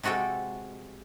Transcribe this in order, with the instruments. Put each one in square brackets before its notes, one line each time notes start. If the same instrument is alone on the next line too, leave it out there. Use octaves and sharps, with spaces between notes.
[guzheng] C3 G#3 F#4 A4 G5